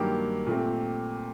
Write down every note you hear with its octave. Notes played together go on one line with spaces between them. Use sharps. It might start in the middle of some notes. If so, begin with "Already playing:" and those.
Already playing: G2 D#3 F#3 A#3 G4
A#2 A3 C4